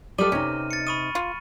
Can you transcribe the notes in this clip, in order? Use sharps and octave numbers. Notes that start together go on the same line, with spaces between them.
G3 G4 A4 B4 D5 D#5 F6 D#7
C3 C#4 D#4
A6 C#7
B5 C#6 D#6 D#7
F4